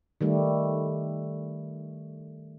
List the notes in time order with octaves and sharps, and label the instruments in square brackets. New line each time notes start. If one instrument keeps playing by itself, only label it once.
[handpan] D#3 G3 A3